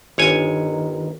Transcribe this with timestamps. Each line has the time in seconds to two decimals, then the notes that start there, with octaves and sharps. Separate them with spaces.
0.18 G1 D#3 C#5 G#5